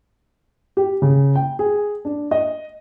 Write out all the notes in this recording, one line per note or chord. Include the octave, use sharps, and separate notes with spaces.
G4
C#3
G5
G#4
D4
D#5